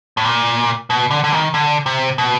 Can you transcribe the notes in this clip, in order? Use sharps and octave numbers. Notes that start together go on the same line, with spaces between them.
A2
A#2
B2
D3
D3
D#3
D3
C3
B2